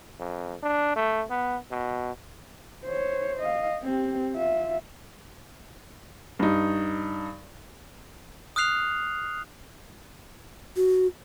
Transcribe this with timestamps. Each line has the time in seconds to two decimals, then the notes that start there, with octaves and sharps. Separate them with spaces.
0.19 F2
0.63 D4
0.96 A3
1.30 B3
1.71 B2
2.85 C5 C#5
3.40 D#5 F5
3.83 C4 G4
4.35 F4 E5
6.39 G2 D#4
8.56 D#6 F6 F#6 C7 F7
10.76 F#4